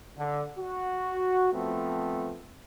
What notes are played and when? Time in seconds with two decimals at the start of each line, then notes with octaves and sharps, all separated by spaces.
0.18 D3
0.58 F#4
1.54 F3 A3 B3 C4